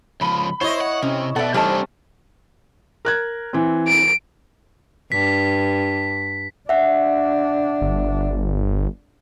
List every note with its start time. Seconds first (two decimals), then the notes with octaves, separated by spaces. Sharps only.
0.21 C#2 F3 B5
0.61 E4 C5 C#5 D#5
0.81 F#5
1.02 C3 C#4
1.36 B2 A4 D5 E5 F#5
1.54 C3 E3 G3 A3 C4 D4 D#4 A5
3.05 A#4 F#6 G#6
3.53 E3 C4
3.88 D7
5.12 G2 B6
6.69 D4 E5 F#5
7.81 G1